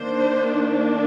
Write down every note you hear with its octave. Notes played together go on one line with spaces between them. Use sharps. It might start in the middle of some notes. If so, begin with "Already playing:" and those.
Already playing: D#3 A#3 D4 C5